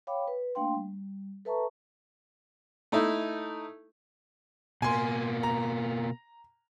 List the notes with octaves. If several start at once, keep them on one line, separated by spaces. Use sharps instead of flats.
C#5 F5 G5 B5 D6
B4
A3 A#3 D4 F5 G5 C6
G3
A4 B4 E5 A5 A#5 C#6
A3 D#4 E4
B2 A#3 G#5 C6
A#5